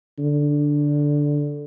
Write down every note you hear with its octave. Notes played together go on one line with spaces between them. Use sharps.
D3